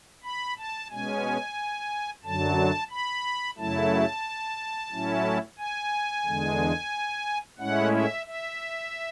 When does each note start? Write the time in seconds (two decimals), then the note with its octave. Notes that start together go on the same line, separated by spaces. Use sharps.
0.24 B5
0.58 A5
0.90 B2 G#3 C#4 G#5
2.24 F#2 D3 F#3 A5
2.90 B5
3.58 F#2 C#3 F#3 A3 E4 A5
4.92 A2 F#3 C#4 E4
5.58 G#5
6.25 E2 D3 G#3
7.58 A2 G#3 C#4 E4 F#5
7.93 E5
8.26 E5